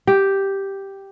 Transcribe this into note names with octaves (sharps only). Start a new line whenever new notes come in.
G4